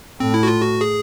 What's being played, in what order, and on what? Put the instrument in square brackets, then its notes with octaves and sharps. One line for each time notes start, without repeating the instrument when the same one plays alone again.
[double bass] A2 [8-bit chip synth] C4
[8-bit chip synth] E4
F#4
F4
F#4
G#4